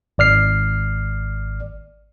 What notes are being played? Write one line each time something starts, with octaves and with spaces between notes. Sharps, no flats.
G#1 D5 F6 C7